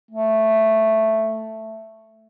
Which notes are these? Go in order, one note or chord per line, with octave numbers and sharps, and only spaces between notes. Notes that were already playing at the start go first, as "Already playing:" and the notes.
A3